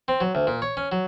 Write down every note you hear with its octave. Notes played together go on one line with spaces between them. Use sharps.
C4
F#3
D2
A#2
C#5
C#4
F#3